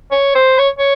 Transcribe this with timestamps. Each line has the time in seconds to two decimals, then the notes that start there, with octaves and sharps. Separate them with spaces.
0.12 C#5
0.35 C5
0.59 C#5
0.79 C#5